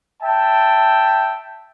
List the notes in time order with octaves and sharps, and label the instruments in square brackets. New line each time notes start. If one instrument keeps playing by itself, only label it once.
[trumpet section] E5 G5 A5